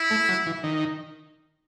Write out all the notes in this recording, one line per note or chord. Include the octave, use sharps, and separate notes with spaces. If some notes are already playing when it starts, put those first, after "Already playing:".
Already playing: E4
A3
F#3
E3
D#3